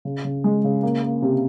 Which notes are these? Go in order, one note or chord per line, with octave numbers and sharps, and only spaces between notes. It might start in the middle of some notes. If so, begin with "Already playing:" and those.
C#3
C#3
G#3
C#3
A#3
A#3
C3